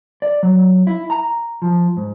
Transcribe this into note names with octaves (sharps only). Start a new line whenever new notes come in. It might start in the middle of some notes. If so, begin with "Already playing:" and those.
D5
F#3
E4
A#5
F3
G#2